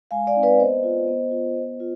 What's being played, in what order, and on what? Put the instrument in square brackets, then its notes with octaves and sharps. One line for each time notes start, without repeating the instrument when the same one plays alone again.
[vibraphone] G#3 F5 G#5
D5 F5
C4 D#4
B4 D5
B3 C5 D#5
F4
B3
F4
B3
F4